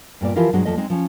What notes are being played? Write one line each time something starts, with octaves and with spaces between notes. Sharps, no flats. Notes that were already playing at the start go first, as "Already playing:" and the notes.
G2 A#2 B3 D5
E3 F3 E4 F4 G4 A#4
G2 B2 F#3 G#3 D4 F#4
E2 F3 A3 D#5
G#3 C4 D#4
F3 C#4